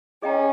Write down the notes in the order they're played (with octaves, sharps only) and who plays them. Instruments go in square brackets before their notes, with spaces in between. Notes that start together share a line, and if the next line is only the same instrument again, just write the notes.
[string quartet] C#4 [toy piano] G#4 D#5 G5 A#5